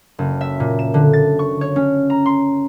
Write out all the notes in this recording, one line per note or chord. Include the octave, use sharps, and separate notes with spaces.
F#1
E5
A#2
E7
D3
A6
C#6
C#5
C#4
A#5
C6